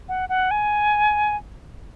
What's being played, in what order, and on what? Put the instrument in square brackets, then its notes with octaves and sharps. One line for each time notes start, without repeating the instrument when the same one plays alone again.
[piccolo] F#5
F#5
G#5